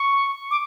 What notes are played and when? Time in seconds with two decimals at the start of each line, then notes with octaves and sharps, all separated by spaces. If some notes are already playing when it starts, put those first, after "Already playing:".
Already playing: C#6
0.51 D6